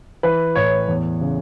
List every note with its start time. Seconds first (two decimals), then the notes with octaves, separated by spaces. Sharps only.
0.23 E3 B4
0.55 A2 C#5
0.88 E2
1.21 C#3